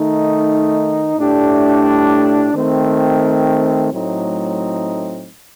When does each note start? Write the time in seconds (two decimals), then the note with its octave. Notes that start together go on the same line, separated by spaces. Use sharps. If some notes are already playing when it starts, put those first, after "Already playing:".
Already playing: D#3 A3 D#4
1.16 A2 A3 D4 G4
2.54 D#3 A3 C4
3.91 A2 F#3 A3 C4 D#4